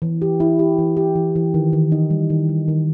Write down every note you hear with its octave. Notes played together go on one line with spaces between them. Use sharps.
E3
G4
E4
G4
E3
G4
E3
E3
D#3
D#3
D#4
G3
D#3
G3
D#3